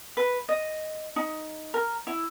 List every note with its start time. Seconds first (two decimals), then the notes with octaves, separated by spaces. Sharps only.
0.17 B4
0.49 D#5
1.16 D#4
1.74 A#4
2.07 E4